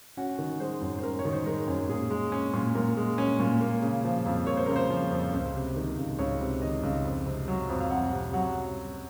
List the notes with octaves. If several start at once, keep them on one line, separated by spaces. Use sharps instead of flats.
C#4 F#4
D#3
G#3 C5
F#2
C5
C#4 A#4
C#5
D#3
C5
G#3 A#4
F#2
A#2 G#4
G#3
C#4
A#2
A#2 A#4
G#3
C#4
A#2
A#3
C#3
F3
F2
A#3 C#5
C5
C#3 A#4
C5
F3
F2
C#2
C3
D#3
C#2
C#2 C#5
C3
D#3 D#5
C#2
F2
C3
F#3
F2
F5
F2 F#5
C3
F#3 F#5